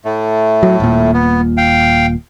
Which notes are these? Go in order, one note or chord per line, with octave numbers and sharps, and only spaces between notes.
A2 A3
F#3
D#1 A#2
B3
F5 G5